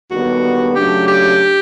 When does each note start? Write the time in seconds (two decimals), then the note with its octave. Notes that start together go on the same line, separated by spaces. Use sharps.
0.11 D#2 D3 G3 B3 D4 F#4
0.75 C#3 F#3 A3 D4 G4
1.08 G4